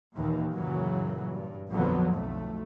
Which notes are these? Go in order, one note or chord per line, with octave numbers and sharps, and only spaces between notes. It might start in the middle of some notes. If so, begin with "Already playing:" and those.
D#2 A#2 D#3 E3
F#1 F#2 A#2 C#3 E3 F#3
G2
A#1 F2 D3 F3 F#3 B3
B1 F2 A3